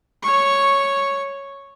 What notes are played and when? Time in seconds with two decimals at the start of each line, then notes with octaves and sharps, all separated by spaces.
0.23 C#5 C#6